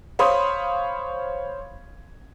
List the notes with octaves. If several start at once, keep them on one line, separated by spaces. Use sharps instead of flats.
C5 C#5 F5 B5 C6 D#6